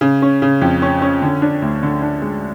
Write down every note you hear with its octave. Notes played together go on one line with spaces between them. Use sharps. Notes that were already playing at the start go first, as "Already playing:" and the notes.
C#3
C#4
C#3
F2
C#4
C#4
D3
D4
D2
D3
D4
G#3